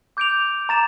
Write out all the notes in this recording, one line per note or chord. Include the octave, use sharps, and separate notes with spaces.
D6 G6 D7 F7
A#5 D6 A6 E7